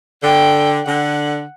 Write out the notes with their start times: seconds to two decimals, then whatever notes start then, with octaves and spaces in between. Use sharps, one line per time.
0.23 D3 G5
0.85 D3 F#5